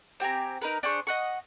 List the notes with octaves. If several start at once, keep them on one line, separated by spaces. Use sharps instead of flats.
C4 G4 G#5 A#5
D#4 A#4 B4
D4 G#4 C5 C#6
D#5 F#5 C#6